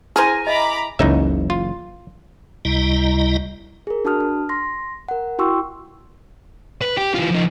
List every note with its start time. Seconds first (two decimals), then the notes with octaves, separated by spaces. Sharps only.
0.16 E4 G#4 A#4 C5 G#5 F6
0.47 D#5 E5 A#5 B5 D6
0.99 F#1 C#2 C#3 E3 D#4 E5
1.50 F4
2.65 C#2 C3 G3 E4 D#5 A#5
3.87 G#4 A#4
4.05 D4 F#4 A5 D#6 F6
4.20 F6
4.49 C6 A#6
5.09 A#4 F#5
5.39 E4 F#4 G5 C6 C#6 E6
6.81 B4
6.97 G4
7.15 E3 F4
7.31 F3 D#4